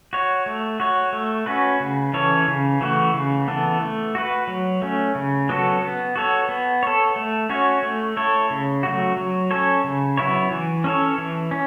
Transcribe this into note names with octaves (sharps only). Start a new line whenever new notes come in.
F#4 C#5
A3
F#4 C#5
A3
C#4 F#4 B4
C#3
E3 C#4 A4 C#5
C#3
E3 A3 F#4
C#3
E3 B3 A4
A3
F#4 B4
F#3
A3 C#4
C#3
F#3 B3 F#4 A4
B3
F#4 A4 C#5
B3
A4 C#5
A3
C#4 F#4 C#5
A3
E4 A4 C#5
C#3
F#3 A3 F#4
F#3
C#4 A4 C#5
C#3
F#3 B3 E4 C#5
E3
C#4 A4 C#5
E3
C#4